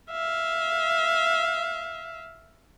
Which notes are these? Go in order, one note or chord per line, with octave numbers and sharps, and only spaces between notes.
E5 F5